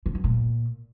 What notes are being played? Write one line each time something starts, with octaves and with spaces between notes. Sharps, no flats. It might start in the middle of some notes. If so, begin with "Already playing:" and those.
D3
F#2
A#2